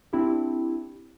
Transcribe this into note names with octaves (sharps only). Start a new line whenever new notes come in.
C4 D4 E4 G4